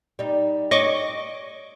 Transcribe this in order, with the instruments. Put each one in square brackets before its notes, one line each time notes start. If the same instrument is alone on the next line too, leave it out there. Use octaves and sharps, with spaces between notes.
[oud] G3 D#4
[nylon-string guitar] C#5 [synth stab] D#5 C#6 D6